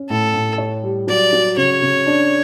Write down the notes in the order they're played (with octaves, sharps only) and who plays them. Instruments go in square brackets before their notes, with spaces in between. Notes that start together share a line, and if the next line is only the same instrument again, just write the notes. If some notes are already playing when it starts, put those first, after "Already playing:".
Already playing: [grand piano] C#4
[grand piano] A2 [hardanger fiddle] A4
[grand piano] A2
C#5
G3
[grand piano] F#3 [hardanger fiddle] D5
[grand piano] F#3
[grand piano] C#3 [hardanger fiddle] C#5
[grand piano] C#3
D4